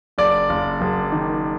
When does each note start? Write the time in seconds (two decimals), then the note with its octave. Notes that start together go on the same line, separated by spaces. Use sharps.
0.18 F#1 D5
0.49 F#1
0.81 F#1
1.12 D#3